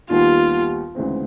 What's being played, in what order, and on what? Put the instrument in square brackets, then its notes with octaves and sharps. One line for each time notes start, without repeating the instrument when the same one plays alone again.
[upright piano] D#2 D#3 G3 B3 [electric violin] F4
[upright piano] D2 C#3 E3 G#3 C4